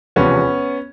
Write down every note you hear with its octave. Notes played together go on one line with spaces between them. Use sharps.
E1 E2 C3 F3 B3 C#4